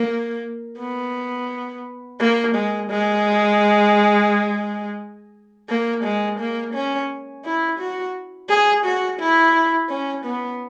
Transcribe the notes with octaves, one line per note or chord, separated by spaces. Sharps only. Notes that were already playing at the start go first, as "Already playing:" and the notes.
Already playing: A#3
B3
A#3
G#3
G#3
A#3
G#3
A#3
C#4
E4
F#4
G#4
F#4
E4
C#4
B3